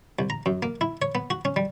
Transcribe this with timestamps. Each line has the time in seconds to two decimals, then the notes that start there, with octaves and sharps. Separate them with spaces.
0.19 C2
0.30 A#5
0.46 F#2
0.63 A#3
0.81 E4
1.02 C#5
1.15 B3
1.30 F#4
1.45 C#4
1.56 G3